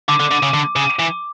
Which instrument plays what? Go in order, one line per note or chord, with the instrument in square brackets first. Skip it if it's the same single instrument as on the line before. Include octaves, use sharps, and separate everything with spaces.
[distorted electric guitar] D3 [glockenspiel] D6
[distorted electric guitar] D3
D3
C#3
D3
C#3
E3